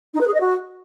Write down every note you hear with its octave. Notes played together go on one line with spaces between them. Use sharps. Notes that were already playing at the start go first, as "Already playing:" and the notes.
D#4
B4
G#4
D#5
F#4